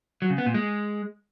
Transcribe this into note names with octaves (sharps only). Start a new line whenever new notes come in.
F#3
C#3
B3
A#2
G#3